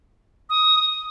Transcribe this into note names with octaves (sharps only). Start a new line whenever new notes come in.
D#6